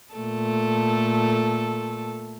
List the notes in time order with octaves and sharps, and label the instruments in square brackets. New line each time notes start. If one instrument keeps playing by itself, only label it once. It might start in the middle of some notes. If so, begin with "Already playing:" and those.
[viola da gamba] A#2 A3 A4